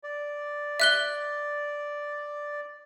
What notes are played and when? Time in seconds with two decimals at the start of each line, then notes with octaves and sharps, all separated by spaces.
0.03 D5
0.80 E5 F#6 G7